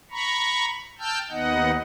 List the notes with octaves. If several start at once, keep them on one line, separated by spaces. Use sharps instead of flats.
A#5 B5 C#6
G5 A5 E6 F6 G6
D#2 B3 D#4 D#5 F#5